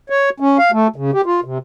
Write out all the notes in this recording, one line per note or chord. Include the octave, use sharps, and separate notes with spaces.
C#5
C#4
F5
A3
C#3
G4
F4
C3